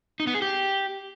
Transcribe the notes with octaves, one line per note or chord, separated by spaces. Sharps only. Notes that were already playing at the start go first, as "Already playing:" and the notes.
D#4
B3
G#4
G4